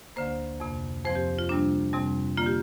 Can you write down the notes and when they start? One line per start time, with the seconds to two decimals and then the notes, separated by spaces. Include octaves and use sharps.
0.16 D2 D3 A#3 C5
0.60 F2 C3 A#3
1.04 F2 F3 C4 C5
1.15 G4
1.39 F4
1.49 C3 G3 A#3 D4
1.93 F2 C3 G3 C4
2.37 D3 A#3 F4
2.46 G4